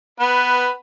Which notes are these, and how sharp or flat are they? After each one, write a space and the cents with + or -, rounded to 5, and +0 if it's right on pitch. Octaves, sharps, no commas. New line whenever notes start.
B3 +10 B4 +0